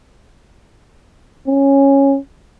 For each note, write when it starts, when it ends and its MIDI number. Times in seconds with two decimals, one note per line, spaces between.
1.47 2.17 61